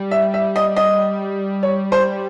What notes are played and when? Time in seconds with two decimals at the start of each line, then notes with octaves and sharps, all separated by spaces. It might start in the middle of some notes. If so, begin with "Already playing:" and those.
Already playing: G3
0.11 E5
0.34 E5
0.56 D#5
0.76 D#5
1.63 C#5
1.92 C5